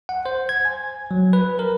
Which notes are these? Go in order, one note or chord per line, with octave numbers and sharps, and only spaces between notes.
F#5
C5
G#6
G#5
F#3
B4
A#4